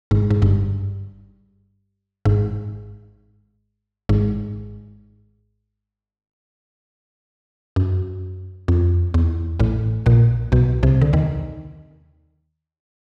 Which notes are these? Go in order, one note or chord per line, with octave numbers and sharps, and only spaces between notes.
G#1 G#2
G#2
G1 G2
G#1 G#2
G#1 G#2
F#2
F2
E2
A1 A2
A#1 A#2
B1 B2
C2 C3
D3
D#2 D#3